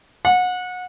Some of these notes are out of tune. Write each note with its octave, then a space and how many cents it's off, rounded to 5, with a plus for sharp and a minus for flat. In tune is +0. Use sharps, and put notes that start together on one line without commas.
F#5 -25